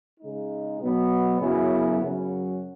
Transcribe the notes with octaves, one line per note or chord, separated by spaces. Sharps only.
C#3 G#3 D#4
B2 F#3 B3
F#2 C#3 F#3 B3 E4
F#2 C#3 F#3 C#4 F#4